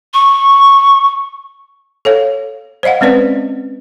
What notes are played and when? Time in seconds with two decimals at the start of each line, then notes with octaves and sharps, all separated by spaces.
0.13 C#6
2.05 A4 C#5 F5
2.83 C5 D5 D#5 F5 F#5
3.01 G#3 C4 C#4 B4 D5